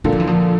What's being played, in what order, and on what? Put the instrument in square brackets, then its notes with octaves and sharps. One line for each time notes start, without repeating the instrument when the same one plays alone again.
[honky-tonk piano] A#2 D3 [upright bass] G3
[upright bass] F3
E3
F3